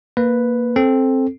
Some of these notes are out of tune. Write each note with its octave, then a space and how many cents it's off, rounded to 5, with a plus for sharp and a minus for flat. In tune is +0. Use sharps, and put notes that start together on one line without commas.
A#3 +0 B4 +0
C4 +10 A4 -5